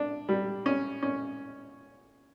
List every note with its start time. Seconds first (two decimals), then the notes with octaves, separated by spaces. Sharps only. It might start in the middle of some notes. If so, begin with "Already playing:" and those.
Already playing: D4
0.29 G3
0.66 C#4
1.02 C#4